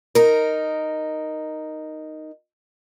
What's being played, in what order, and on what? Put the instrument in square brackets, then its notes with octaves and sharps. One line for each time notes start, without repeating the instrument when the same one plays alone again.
[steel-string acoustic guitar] D#4 A#4